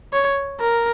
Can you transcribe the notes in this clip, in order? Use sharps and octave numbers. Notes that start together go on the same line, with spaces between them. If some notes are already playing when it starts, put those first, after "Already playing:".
C#5
A#4